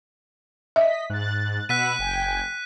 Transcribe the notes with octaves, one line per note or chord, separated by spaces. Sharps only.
D#5 E5 B6
G#2 F#6 A6
B2 F#5 B5 E6 F#6 B6 D#7
F#1 G5 G#5